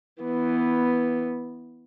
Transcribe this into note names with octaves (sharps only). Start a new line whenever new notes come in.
E3 B3